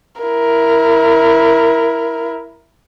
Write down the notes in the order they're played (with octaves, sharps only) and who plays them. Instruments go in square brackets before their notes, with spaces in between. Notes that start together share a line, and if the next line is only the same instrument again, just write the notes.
[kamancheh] E4 A#4